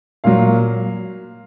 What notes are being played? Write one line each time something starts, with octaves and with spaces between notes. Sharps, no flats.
A#2 F#3 F5